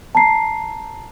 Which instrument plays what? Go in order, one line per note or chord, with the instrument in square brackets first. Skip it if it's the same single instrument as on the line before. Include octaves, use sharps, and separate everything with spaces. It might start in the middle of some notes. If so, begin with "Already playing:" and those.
[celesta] A5 A#5 C7